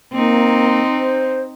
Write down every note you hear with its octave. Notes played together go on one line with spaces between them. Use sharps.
A#3 C4 D#4
C5